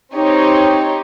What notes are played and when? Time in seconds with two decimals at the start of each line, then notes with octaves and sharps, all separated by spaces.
0.16 C4 D#4 G4 C#5